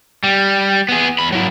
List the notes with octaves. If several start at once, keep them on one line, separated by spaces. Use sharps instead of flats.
G3
B3 G#4
E2 B5
F#3 E4